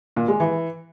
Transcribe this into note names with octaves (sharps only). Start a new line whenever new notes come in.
A#2
G#3
E3